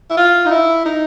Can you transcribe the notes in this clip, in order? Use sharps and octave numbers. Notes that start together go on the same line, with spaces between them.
E4
F4
D#4
E4
D#4